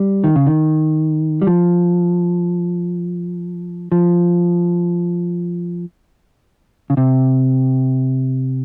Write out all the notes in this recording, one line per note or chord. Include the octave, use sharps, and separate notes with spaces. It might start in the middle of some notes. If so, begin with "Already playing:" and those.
Already playing: G3
D#3
C#3
D#3
G3
F3
F3
C#3
C3